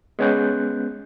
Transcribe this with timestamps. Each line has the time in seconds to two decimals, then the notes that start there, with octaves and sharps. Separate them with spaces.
0.19 G#3 B3 C#4 F#6 G6